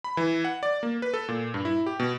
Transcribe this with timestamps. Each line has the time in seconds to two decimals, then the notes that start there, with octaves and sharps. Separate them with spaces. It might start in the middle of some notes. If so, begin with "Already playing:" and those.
0.04 B5
0.17 E3
0.45 F#5
0.63 D5
0.83 A#3
1.02 B4
1.14 A4
1.29 A#2
1.54 G2
1.65 E4
1.86 G4
2.00 B2